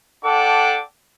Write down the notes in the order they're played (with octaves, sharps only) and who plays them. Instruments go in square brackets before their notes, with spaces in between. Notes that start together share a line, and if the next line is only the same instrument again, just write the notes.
[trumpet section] D4 A4 F#5 G5 D6